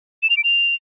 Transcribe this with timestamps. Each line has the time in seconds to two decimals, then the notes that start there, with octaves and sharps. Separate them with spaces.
0.23 E7
0.30 F7
0.37 D7
0.44 F7